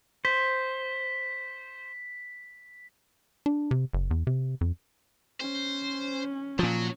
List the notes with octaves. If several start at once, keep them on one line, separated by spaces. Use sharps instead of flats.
C5 B6
D4
C3
F#1
E2
C3
F2
C#4 C5
A#2 F3 F#3